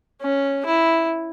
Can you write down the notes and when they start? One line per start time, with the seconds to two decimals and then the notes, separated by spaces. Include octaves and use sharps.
0.21 C#4
0.66 E4